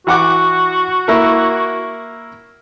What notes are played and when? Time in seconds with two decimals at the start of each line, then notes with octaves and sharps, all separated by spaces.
0.07 E3 F#4 F#5 D6
1.08 A#3 E4 A#4